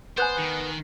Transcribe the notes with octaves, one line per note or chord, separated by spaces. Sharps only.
B3 C5 G#5 F#6 G6
D#3